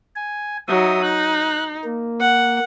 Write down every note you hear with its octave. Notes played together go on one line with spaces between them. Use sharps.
G#5
F#3 D#4 E5 D#6
D#4 F#6
A#3
F#5